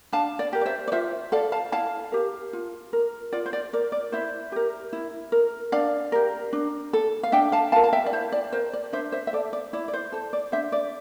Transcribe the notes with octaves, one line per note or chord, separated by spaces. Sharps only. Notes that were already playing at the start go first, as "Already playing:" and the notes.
D4 F5 A5
D5
G4 A#4
D5
C5 E5
D5
F4 C5 E5
A4 D5 F5
F5 A5
E4 F5 A5
G4 A#4
F4
A#4
F4 D5
C5
D5
A#4 D5
D5
E4 C5 E5
G4 A#4
E4
A#4
D4 D5 F5
G4 A#4
D4
A4
F5
D4 E5 G5
F5 A5
F4 A#4 F5 A5
A5
E5 G5
D5
E4 C5
D5
A#4 C5
D5
D4 C5 E5
C5 E5
E5
A4 D5
D5
E4 D5
D5
C5
A4 C5
D5
D4 C5 E5
D5